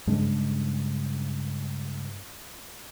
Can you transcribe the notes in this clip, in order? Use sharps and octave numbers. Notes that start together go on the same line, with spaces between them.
G2 C#3 G#3 D4